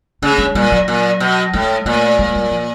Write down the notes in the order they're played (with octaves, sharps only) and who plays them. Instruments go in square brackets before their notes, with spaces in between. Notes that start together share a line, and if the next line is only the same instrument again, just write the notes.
[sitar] C#3 [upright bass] A3
[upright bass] G#3
[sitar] A#2 [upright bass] G3
[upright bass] F#3
[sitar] A#2
B2
[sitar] A2 [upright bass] G#3
[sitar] A#2 [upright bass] A3
[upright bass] G#3
G3
F3